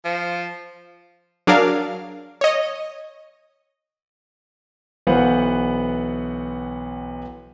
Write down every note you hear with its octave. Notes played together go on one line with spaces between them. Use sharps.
F3
F#3 D4 G#4 A#4 F5
C#5 D#5
B1 E3 B3 C5 F5 F#5